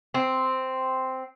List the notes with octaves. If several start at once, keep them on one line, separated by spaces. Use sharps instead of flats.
C4